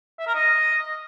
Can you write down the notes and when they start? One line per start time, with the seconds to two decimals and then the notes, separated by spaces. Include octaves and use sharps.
0.19 E5
0.27 A#4
0.35 D#5